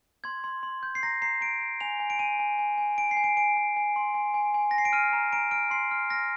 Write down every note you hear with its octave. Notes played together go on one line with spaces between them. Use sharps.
C6 G#6
C6
C6
G6
C7
A#5 A#6
A#5 C7
A#5 D7
A#5
G#5 F7
G#5
D7
G#5 D#7
G#5
G#5
G#5
G#5 D7
C7
G#5
D7
G#5 D7
G#5
G#5
C6
G#5
G#5
G#5
A#6
G#5 C7
D7
F6 D#7
A#5
A#5 D7
F6 D7
C6 C7
F6
F6 A#6